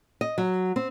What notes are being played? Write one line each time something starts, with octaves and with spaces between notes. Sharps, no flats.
D#5
F#3
C4